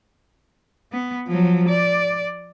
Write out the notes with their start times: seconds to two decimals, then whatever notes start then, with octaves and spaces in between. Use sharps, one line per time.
0.93 B3
1.27 F3 F#3
1.68 D5